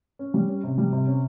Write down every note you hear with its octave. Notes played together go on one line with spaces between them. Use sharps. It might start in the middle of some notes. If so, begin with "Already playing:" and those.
C#4
G3
C#4
C3
G3
C3
C#4